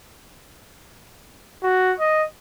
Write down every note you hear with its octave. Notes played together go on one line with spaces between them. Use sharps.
F#4
D#5